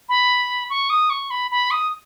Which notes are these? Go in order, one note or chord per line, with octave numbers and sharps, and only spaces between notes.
B5
C#6
D#6
C#6
B5
B5
D#6